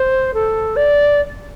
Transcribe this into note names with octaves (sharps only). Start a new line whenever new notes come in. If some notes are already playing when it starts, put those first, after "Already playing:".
Already playing: C5
A4
D5